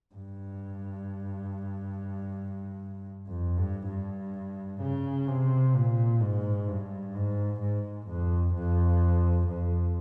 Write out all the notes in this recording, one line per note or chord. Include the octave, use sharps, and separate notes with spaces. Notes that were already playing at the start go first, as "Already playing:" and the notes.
G2
F2
G2
G2
C#3
C3
A#2
G#2
G2
G#2
G#2
F2
F2
F2